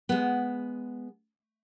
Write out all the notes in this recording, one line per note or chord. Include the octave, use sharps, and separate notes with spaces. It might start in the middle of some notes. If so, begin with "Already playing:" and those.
G#3 B3